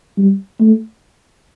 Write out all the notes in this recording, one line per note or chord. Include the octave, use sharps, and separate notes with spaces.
G3
A3